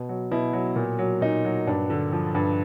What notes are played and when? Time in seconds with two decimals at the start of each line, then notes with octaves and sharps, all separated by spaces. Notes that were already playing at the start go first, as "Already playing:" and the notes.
Already playing: B2
0.09 F#3
0.31 B2 E4
0.53 F#3
0.76 A#2
0.99 F#3
1.21 A#2 D#4
1.45 F#3
1.67 G2 D4
1.90 D3
2.12 F3
2.35 G2